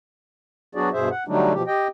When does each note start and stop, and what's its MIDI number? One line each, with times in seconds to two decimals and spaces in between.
0.75 0.90 54
0.75 0.90 59
0.75 0.90 62
0.75 0.90 66
0.75 0.90 68
0.75 0.90 74
0.93 1.09 43
0.93 1.09 47
0.93 1.09 68
0.93 1.09 72
0.93 1.09 76
1.11 1.24 78
1.28 1.53 50
1.28 1.53 54
1.28 1.53 55
1.28 1.53 57
1.28 1.53 62
1.28 1.53 63
1.53 1.63 47
1.53 1.63 53
1.53 1.63 67
1.67 1.88 67
1.67 1.88 75
1.67 1.88 79